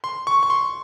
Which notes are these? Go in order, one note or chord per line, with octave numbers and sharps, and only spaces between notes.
C6
C#6
C#6
C6